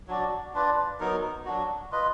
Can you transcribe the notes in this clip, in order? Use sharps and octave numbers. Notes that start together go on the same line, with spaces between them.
F#3 D4 F#4 D5
D4 F4 B4 D5
F#3 B3 D#4 A#4
F#3 D4 F#4
F4 B4 D#5